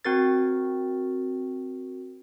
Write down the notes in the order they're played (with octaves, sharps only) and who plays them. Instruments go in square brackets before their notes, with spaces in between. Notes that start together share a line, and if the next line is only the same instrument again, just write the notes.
[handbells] C4 F#4 A#4 A6